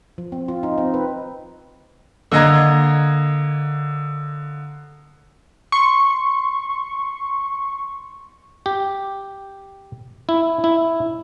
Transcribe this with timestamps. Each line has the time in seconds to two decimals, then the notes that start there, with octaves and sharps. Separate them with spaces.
0.18 F3
0.32 C4
0.48 F4
0.63 D#4
0.78 C4
0.94 B4
2.32 D3 A#3 D#5 A#5 G#6
5.72 C6 C#6
8.66 G4
10.29 E4
10.64 E4